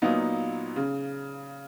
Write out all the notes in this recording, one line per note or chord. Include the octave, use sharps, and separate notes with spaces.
A#2 F#3 A#3 B3 D#4
C#3